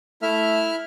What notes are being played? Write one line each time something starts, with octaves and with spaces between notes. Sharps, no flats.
A3 E4 E5 F6